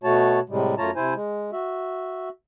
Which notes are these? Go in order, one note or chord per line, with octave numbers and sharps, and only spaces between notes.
B2 A3 F#4 C#5 A5
A2 C3 G3 G#3
F#2 A3 F4 C#5 A5 A#5
C3 E4 C5 G#5
G#3
F#4 E5